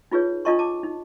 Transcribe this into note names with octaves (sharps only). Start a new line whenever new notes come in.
D#4 F4 G#4 B4 C#5
D4 F4 A4 D#5 A5 C#6
A5 D6
D#4